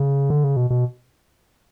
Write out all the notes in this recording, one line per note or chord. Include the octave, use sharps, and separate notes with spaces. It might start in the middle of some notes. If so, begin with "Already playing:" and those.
Already playing: C#3
D3
C#3
B2
B2